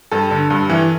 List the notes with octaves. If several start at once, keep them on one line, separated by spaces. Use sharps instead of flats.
G2 A4
D3
G2
E3